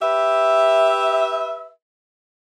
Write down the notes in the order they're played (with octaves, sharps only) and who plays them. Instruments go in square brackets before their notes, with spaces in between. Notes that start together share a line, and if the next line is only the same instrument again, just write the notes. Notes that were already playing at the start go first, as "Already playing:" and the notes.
[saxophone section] G4 B4 E5